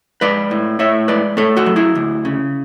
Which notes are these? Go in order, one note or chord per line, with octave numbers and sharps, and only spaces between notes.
G#3 B4 D5
A2
A2 C#5 E5
G#3 B4 D5
A3 A4 C#5
F#4 A4
F#3
E4 G#4
D2
C#3